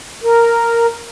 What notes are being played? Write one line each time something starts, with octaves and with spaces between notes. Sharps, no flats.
A#4